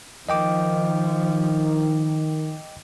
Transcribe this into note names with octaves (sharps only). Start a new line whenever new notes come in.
D#3 F3 D#5 G5 D6